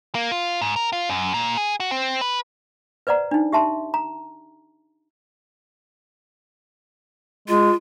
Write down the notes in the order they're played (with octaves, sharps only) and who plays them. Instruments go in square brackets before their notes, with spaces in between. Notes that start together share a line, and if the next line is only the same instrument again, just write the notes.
[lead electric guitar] A#3
F4
G#2
A#4
F4
F#2
A#2
G#4
F#4
C4
B4
[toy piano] B4 C5 D5 F#5 A#5
D4 D#4
G4 E5 A5 C6
A#5
[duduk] G#3 [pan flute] F4